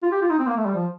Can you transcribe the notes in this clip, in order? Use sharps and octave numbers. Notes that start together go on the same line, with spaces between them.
F4
G4
F4
D#4
C4
A#3
A3
G3
F3